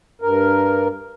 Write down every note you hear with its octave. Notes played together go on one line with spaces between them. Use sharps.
G2 A#4